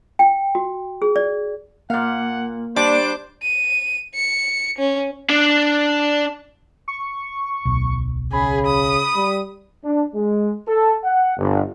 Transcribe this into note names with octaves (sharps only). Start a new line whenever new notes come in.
G5
F#4
G#4
D5
A#2 A#3 F5 F#5
G3 D4 C5 D6
D#7
C#7
C#4
D4 D5
C#6
D1 B1
C#3 G#4 B5
D#6
G3
D4
G#3
A4
F#5
G1